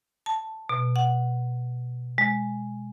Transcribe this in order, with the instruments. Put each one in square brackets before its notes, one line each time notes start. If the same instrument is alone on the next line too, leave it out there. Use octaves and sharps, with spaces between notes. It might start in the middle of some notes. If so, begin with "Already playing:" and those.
[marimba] A5
B2
F#5
G#3